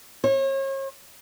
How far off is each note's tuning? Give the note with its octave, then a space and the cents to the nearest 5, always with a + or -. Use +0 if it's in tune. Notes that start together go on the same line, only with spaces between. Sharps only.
C#5 -40